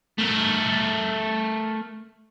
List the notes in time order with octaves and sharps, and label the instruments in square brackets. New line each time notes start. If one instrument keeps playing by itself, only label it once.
[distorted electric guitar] A3 A#4